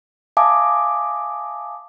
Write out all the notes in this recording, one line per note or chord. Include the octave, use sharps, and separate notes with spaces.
E5 F5 G#5 A5 D6 D#6